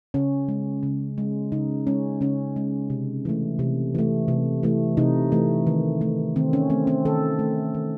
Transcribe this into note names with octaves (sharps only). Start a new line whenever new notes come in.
C#3 C#4
G#3
C#3
G#3
C#3 D#4
G#3 C#4
C#3 C#4
G#3
C3
E3 A3
C3
E3 A3
C3
E3 A3
C3 D#4
E3 A3
D#3
A3
D#3 C4
C#4
A3 C4
C4
D#3 A4
A3
D#3